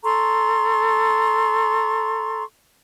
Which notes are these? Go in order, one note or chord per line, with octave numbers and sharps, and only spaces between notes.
A4 A#5 C6 C#6